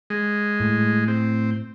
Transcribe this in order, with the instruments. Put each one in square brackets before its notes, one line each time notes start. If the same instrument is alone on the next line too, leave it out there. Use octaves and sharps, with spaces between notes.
[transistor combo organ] G#3
[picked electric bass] A2
[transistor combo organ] C4